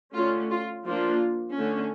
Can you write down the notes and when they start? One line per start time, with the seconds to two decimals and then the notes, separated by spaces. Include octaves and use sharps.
0.15 D3 A3 C#4 F4
0.50 F4
0.85 F3 A#3 D4 F4
1.55 D3 A3 C#4